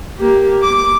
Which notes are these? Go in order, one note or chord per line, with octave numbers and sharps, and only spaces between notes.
A#3 G4
D6